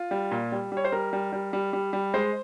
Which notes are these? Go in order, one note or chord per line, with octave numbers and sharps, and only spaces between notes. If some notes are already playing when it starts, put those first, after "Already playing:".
Already playing: F4
G3
A#2
G3
G3
C#5
C5
G3 A#4
G3
G3
G3
G3
G3
G#3 C5